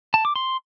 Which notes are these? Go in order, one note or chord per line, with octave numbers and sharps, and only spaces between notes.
A5
D6
C6